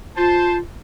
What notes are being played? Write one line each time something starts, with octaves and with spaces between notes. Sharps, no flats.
F4 C5 A5